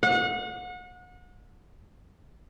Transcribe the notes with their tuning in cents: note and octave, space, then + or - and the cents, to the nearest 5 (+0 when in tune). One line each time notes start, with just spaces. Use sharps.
F#5 -35